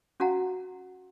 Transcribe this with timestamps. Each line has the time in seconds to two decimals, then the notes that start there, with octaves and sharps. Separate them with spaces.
0.20 C#4 F#4 F5 F#5 A#5